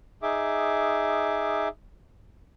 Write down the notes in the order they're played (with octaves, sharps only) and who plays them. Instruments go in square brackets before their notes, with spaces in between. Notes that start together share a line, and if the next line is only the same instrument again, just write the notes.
[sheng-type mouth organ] D#4 G#4 E5 D6